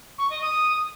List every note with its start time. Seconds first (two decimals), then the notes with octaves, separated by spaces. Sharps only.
0.18 C#6
0.30 D#5
0.42 D#6